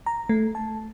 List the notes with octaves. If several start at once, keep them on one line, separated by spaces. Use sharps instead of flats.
A#5
A3
A5